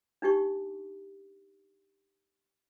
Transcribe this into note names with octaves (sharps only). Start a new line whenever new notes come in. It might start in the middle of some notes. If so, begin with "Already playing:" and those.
D4 D#4 G4 C#6